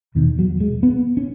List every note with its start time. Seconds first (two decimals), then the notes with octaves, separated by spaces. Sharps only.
0.15 E2 B2 D#3
0.39 F#3
0.60 G#3
0.83 B3
1.17 C#4